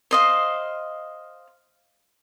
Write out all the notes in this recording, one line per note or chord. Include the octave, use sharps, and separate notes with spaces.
C5 D#5 F5